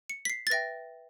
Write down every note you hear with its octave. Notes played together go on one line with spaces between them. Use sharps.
C#7
B6
C7
A6
B4 E5 G5 A#6